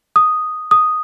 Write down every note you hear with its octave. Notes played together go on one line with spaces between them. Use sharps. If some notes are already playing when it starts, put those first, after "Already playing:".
D#6
D#6